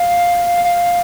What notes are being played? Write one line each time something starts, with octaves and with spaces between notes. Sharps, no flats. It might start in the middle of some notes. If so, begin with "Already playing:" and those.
Already playing: F5
F5